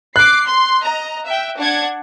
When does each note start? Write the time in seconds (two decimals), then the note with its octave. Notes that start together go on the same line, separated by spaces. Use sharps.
0.16 D6 F#6 C7
0.47 C6
0.83 D#5 A#5
1.27 E5 G5
1.59 D4 F#5 G#6